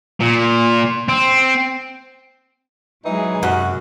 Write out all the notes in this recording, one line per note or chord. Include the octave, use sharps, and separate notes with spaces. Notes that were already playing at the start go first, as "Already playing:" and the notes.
A#2
C4
E3 F#3 G#3 D#4 G#4
F#2 C3 F#4